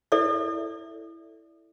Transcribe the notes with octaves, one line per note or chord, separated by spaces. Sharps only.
E4 A4 D5 E5